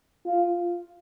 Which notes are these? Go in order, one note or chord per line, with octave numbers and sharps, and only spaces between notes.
F4